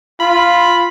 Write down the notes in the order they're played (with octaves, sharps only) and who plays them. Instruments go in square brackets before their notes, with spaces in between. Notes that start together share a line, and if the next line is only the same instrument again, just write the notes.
[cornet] F4 [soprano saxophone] B5